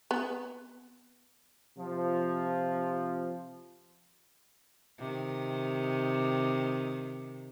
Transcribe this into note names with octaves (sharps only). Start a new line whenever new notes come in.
B3
C3 F3
C3 D#3